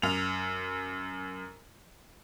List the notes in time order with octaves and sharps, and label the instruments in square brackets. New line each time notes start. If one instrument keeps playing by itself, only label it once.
[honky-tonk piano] F#2 F7